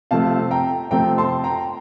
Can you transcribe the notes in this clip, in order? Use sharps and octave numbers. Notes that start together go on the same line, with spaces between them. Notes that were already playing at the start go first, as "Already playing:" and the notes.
C3 F3 A3 C4 F5 A5
G5 A#5
C3 F3 A3 C4 G5 A#5
A5 C6
G5 A#5